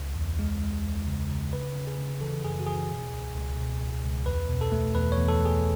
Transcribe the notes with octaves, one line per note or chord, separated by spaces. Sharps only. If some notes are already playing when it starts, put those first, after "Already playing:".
Already playing: C#2
E2
G#3
G#3
E2
C#3
C#3
C#3 B4
C#3
G#4
C#3
E3 A4
F#2 G#4
F#4
E3 G#4
B2
C#2
C#2
B2
C#2
C#2
E2 B4
B2
A4
A3
E2 B4
C#5
E2
A4
A3
G#4